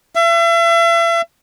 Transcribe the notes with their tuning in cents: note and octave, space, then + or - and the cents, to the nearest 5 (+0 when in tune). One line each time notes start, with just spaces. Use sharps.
E5 +40